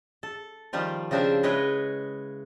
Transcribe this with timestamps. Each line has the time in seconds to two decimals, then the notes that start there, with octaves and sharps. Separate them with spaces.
0.23 A4
0.73 D#3 F3 G3 F4
1.11 C#3 F3 C4 D4 E5
1.43 G#3 E4 B4 C#5 D#5 G5